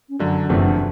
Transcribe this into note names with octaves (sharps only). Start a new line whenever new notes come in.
C#4
F#2 D3 F#3 D4
F#1 E2 C3 F3 A3 D4
D4